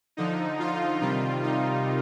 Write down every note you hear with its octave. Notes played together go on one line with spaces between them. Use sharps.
D3 F3 D#4
F4
C3 D#3 G3 F4
D#4